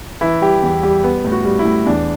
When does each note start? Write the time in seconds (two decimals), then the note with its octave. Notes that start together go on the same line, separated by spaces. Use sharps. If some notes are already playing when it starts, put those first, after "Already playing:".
0.21 E3 E4
0.41 G3 G4
0.63 E2
0.83 G3 G4
1.04 B3
1.25 A2
1.32 F#4
1.45 G3
1.59 E4
1.65 A2
1.86 E2 D4